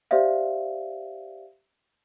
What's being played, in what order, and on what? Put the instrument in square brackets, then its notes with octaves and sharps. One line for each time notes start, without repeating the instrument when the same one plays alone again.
[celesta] G4 C5 D5 E5 F5